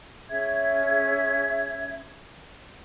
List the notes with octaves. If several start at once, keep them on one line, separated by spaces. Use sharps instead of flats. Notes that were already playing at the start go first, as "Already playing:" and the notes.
C#4 G#4 E5 G#6